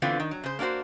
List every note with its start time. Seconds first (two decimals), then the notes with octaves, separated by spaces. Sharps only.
0.02 D3 E3 B3 C4 F4
0.20 D#3
0.31 F#3
0.43 C#3 C5
0.59 A#3 D4 F4 F#4 C5